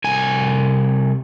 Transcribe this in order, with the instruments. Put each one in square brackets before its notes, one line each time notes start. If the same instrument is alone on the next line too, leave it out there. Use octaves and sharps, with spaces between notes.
[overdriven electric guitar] C2 G#5